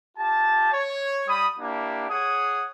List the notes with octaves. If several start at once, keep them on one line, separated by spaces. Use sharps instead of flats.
F4 G4 A5
C#5
G3 B5 D#6
A#3 D4 E4 G4
G#4 C#5 F#5 D#6